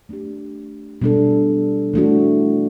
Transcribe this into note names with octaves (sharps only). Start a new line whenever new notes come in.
A3 D4 G4
B2 G3 D4 A4
E3 A3 D4 F#4